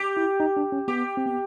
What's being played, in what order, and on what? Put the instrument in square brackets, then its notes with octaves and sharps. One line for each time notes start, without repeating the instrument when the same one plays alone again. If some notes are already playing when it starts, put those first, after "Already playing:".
Already playing: [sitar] G4
[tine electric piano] E4
D#4
D4
C#4
[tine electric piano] B3 [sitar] G4
[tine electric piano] C4
B3